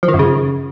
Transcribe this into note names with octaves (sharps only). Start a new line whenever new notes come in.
F3
D#3
F#2
C#3